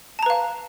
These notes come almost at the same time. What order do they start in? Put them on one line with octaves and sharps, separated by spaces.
A5 A#5 B4 F5